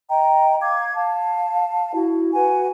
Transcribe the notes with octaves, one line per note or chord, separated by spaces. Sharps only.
D#5 G5 A#5
F5 D6 G#6
F5 A5
E4 F#4
F#4 B4 F#5 G#5